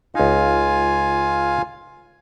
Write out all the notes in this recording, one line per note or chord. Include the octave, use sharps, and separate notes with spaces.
C#2 D#4 F4 F5 G#5